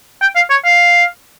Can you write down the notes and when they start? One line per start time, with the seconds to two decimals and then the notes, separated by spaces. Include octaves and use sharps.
0.21 G5
0.35 F5
0.50 C#5
0.65 F5